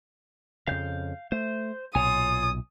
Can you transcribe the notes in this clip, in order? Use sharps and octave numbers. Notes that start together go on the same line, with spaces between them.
F2 C#3 F5 G6
A3 C5
B1 A#2 F4 C#5 G#5 D#6